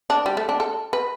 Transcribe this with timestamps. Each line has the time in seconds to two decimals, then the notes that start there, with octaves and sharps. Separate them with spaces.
0.10 D4
0.26 G3
0.37 A3
0.49 D4
0.60 A4
0.93 B4